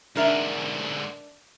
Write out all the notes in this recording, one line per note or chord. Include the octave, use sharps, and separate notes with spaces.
G#2 D3 D4 A#4 E5